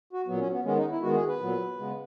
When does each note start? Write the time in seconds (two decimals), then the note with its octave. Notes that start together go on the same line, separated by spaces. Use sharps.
0.13 F#4
0.26 A#2 F#3 B3
0.39 C#4
0.51 B3
0.64 D#3 G#3 B3 C#4
0.77 D#4
0.90 E4
1.02 D#3 G#3 B3 F#4
1.15 G#4
1.28 B4
1.40 A#2 F#3 B3
1.78 C#3 G#3 B3